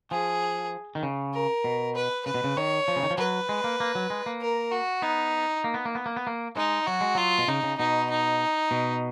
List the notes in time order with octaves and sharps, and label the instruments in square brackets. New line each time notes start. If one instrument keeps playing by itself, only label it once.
[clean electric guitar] F3 [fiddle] G#4
[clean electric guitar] D#3
C#3
[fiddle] A#4
[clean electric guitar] B2
[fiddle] B4
[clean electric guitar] C#3 [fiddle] B4
[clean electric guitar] B2
C#3
[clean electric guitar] D#3 [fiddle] C#5
[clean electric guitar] F3
C#3
D#3
F3
[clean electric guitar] F#3 [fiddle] B4
[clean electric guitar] G#3
A#3
A#3
F#3
G#3
A#3
[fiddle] A#4
F#4
[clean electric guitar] B3 [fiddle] D#4
[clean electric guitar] A#3
B3
A#3
B3
A#3
B3
A#3
[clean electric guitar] G#3 [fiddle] D#4
[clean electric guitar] F#3 [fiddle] F#4
[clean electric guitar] G#3
[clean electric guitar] F#3 [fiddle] F4
[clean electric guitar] B2
[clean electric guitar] C#3 [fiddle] D#4
[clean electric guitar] C#3
[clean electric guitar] B2 [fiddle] D#4
[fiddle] D#4
[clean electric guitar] B2